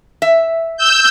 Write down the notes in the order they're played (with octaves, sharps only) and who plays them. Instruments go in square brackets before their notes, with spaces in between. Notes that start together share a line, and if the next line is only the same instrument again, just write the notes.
[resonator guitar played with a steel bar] E5
[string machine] E6 G6